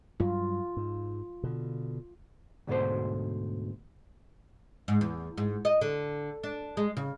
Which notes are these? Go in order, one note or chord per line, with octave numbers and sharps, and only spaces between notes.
G2 F#3 F4
G#2
B2 D3
D2 G#2 B2 A4 C5
G#2
E2
G#2
D#5
D3
D4
G#3
C#3